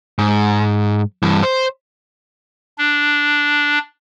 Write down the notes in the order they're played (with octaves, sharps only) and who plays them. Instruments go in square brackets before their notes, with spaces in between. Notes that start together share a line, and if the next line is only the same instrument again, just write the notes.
[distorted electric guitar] G#2
G2 E3
C5
[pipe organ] D4